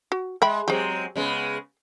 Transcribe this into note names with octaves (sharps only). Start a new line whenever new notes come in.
F#4
G#3 E5 G5 B5
F#3 G#3 C4 G4 G#4
C#3 G#3 B3